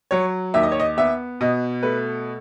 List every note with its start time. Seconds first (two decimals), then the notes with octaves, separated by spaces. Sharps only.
0.11 F#3 C#5
0.54 D#2 E5
0.63 D#5
0.72 C#5
0.80 D#5
0.97 B3 E5
1.41 B2 D#5
1.83 A3 B4